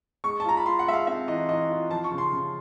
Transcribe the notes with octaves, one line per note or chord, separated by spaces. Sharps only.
G#3 C#6
A5
F4 A#5
B5
F4 C6
F#5
G#3 E5
F5
C4 E5
E3 D#5
E3 D#5
F4
F3 A5
C#6
C#3
C6
C#3